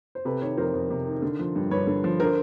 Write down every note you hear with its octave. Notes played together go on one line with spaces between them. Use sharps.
C5
C3 A4 B4
D#3 B4 C#5
F2 A#4 C5
F2
C3
D#3
D3
F3
G2
G2 B4 C#5
D3
F3
D3 A#4 C5